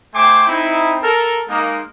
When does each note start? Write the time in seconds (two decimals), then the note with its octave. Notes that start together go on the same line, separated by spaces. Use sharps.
0.14 A3 C5 G5 G#5 C6 D6
0.47 C4 D#4 E4
1.03 A4 A#4
1.48 G#3 A#3 D#4